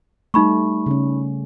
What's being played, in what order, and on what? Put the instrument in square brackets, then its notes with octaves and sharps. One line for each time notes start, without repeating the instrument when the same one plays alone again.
[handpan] G3 A3 [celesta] D#4 B5 C#6
[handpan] C#3 C#4